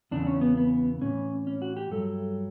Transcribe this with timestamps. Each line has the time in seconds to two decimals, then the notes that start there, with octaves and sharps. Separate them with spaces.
0.11 E2 C#3 E3 D4
0.27 C#4
0.41 B3
0.57 B3
1.02 A2 E3 C#4
1.47 C#4
1.62 F#4
1.77 G4
1.91 G2 F#3 A4